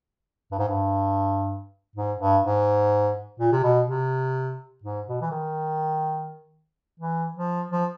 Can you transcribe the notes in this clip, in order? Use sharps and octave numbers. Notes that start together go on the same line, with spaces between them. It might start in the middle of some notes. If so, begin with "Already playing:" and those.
G2
G#2
G2
G#2
G2
G#2
A#2
C3
B2
C3
G#2
B2
E3
D#3
E3
F3
F3